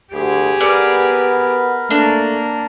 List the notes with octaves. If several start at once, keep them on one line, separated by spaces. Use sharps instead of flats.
D2 G4 G#4
B3 A#4 B4 D5
A3 A#3 D4